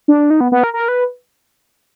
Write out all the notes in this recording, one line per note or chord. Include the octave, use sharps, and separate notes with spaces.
D4
D#4
B3
B3
A#4
A#4
B4